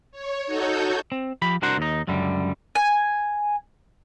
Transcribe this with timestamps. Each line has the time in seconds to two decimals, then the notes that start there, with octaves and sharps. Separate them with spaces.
0.12 C#5
0.46 D#4 F#4 A4 C#5 G6
1.12 C4
1.42 F3 G4 B5
1.62 C2 D4 F#4 A#4 C5 F#5
1.77 D#2 D#4
2.07 C#2 F#2 D3 G3
2.75 G#5